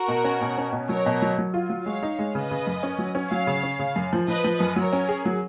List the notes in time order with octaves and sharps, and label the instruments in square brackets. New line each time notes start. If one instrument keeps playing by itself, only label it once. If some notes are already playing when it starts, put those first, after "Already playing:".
Already playing: [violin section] F#4 A#4
[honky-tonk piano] B2
C#4
B2
C#4
B2
[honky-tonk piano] F#3 [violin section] A#4 C#5
[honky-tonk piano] B2
F#3
F#3
F4
F#3
[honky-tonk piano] G#3 [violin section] C#5 F5
[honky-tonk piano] D#4
G#3
[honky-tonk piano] C#3 [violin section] B4 D#5
[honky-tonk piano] C#3
F#2
C#4
F#3
C#4
[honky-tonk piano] F#3 [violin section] C#5 F5
[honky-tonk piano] C#3
C#4
C#3
F#2
F3
[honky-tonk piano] F3 [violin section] B4 D#5
[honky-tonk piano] F3
F#2
[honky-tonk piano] F#3 [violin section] A#4 C#5
[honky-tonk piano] C#4
G#4
F#3